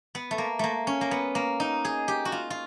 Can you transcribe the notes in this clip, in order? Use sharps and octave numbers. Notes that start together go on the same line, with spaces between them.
B3
A3
A#3
A3 A#3
C#4
A#3
B3
A#3
D#4
G#4
G4
F#4
F4
F4